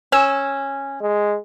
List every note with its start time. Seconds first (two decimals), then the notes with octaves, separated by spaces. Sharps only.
0.12 C#4 G#5 E6 E7
1.01 G#3